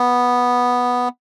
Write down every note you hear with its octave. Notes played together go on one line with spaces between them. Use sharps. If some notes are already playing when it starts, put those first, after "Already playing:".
Already playing: B3